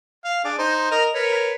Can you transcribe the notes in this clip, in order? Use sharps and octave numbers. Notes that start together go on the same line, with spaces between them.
F5
D4 G#4 D5
D#4 C5
A#4 D#5 A#5
A#4 B4 C#5